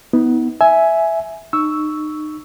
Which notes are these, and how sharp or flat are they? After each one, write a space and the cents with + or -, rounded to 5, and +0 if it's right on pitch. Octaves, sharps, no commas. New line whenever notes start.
B3 +5 D#4 +45
E5 +0 G#5 +10
D#4 -30 C#6 +10 E6 +0